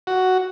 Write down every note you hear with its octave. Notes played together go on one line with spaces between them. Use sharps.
F#4